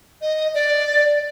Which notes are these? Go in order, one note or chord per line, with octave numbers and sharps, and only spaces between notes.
D#5
D5